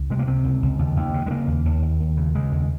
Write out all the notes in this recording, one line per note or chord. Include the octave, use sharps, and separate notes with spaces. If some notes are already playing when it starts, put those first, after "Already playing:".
Already playing: C#2
C3 G#3
A#3
C3 C4
C#2
C#2
D#2
D#2
C#3
G#3
C#3 A#3
D#2
D#2
D#2
D#2
C#3
C#3 G#3
D#2